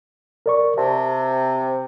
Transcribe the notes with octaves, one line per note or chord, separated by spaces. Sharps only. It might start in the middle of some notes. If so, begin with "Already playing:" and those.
A#4 D5 C#6
C3 A5